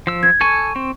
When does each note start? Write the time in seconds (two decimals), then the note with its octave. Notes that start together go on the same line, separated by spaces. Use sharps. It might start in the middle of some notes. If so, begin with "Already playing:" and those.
0.07 F3 E6
0.23 G#6
0.41 A4 G#5 C#6
0.76 C4